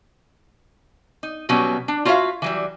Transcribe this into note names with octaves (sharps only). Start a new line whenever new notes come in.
D#4
B2 F#3 G3 B3 C#4
D4
F4 F#4 C#5 E5 F5
E3 F#3 G3